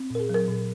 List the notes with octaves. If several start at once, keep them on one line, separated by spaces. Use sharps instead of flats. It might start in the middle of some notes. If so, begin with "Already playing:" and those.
Already playing: C4
A#2 A#4
G#4
F#3 A#4
A#2